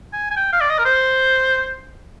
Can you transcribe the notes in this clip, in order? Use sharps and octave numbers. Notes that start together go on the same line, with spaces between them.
G#5
G#5
G5
F5
D5
D#5
A#4
C5